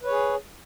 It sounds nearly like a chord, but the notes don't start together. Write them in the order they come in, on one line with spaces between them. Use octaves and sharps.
B4 C#5 G#4